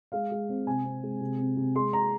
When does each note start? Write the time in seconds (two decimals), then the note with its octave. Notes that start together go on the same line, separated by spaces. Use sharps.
0.12 G#3 F5
0.31 G#3
0.49 C4
0.66 C3 G#5
0.84 C4
1.03 G#3
1.21 C3
1.38 C3
1.57 C3
1.75 G#3 C6
1.93 A#5